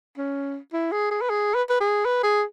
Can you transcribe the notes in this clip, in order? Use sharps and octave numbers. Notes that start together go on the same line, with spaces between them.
C#4
E4
G#4
G#4
B4
G#4
B4
B4
G#4
B4
G#4